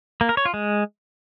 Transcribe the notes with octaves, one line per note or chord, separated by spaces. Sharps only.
A#3
A#4
C#5
F4
G#3